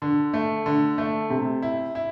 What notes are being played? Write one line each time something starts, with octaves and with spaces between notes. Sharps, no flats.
D3
A3
D3
A3
C3
E4
E4